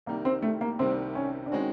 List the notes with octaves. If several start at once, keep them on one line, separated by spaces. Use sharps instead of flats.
C2 C3 D#3 G3 A#3
C4
A3
A#3
C2 C3 D#3 G3 C4
C#4
D4
D#3 G#3 C4 C#4 D#4 F#4